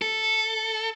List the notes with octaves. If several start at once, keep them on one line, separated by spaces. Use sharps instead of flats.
A4